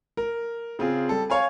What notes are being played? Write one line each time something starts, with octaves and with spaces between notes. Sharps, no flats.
A#4
C#3 C4 F4 G#4
G3 A4
C#5 F5 G#5